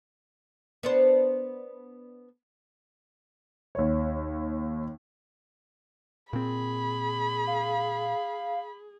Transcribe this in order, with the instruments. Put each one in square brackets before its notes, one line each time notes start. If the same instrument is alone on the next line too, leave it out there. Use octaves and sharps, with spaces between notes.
[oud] B3 D4 C5
[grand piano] D#2 C#5
[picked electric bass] A#2 C4 [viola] G#4 [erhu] B5
[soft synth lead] F5